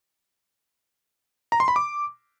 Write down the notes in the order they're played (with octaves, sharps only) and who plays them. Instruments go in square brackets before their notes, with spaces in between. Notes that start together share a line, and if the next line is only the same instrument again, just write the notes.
[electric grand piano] A#5
C6
B5
D6